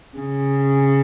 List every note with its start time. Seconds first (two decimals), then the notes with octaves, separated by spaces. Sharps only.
0.18 C#3